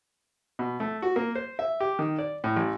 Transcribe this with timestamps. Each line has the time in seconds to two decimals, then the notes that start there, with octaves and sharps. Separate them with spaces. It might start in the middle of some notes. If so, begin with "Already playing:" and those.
0.59 B2
0.80 A3
1.02 F#4
1.16 A#3
1.35 C5
1.59 E5
1.80 G4
1.99 D#3
2.19 D5
2.44 A2
2.56 A1